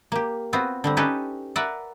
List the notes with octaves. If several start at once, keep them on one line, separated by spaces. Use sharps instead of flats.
A#3 G4
B3 C4 F4 F#4
D3 G3 C4
C#4 D#4 G4 A4 B4
A#4 B4 D5 E5 F#5